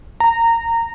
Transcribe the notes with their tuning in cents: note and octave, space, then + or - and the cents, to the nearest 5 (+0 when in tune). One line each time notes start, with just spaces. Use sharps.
A#5 -20